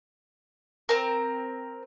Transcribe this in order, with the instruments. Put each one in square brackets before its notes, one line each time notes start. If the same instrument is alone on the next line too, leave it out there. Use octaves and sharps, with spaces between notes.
[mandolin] C4 A#4